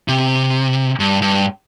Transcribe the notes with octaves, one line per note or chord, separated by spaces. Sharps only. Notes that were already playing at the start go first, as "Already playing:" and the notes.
C3
G2
G2